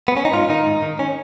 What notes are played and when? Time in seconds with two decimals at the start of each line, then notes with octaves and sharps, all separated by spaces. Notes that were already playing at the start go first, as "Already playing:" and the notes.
0.08 B3
0.16 C#4
0.25 D#4
0.33 G#2 F4
0.49 D#3 D#4
0.66 G#2
0.82 D#3
0.99 C#4